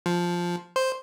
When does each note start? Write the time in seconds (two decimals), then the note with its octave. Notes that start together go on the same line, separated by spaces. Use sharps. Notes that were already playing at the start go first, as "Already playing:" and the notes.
0.06 F3
0.76 C5